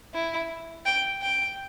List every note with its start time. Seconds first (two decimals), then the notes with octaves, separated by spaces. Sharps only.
0.14 E4
0.86 G5
1.22 G5